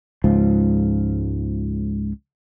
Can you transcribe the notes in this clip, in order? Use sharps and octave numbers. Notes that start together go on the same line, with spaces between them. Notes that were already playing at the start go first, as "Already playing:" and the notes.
C#2 G#2 F3